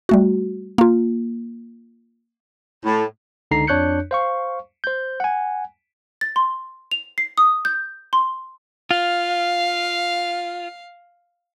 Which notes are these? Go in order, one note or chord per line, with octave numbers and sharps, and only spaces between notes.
G3 A3 F#4
A#3 F4
A2
C#2 D3 D#4 A#5 C7
F2 D4 C#5 F#6 G6 C#7
C5 F5 C#6
C5 G6
F#5 G#5
A6
C6
F7
C7
D#6
G6
C6
F4 F5